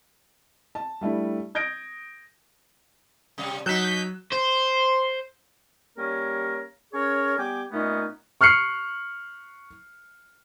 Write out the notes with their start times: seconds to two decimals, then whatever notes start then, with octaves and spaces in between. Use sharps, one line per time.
0.75 A5
1.01 G3 A3 D4 E4
1.55 D#6 G6 G#6 A#6 D7
3.38 C3 G3
3.66 B2 F#3 D#4 F#6 G6 B6 E7
4.33 C5
5.97 G3 A#3 C#4 A#4 C#5
6.93 C#4 G#4 A#4 C#5
7.37 G3 B3 G5 G#5 D6
7.71 A#2 A3 B3 C#4 D#4
8.41 C#6 F6 F#6 C7 C#7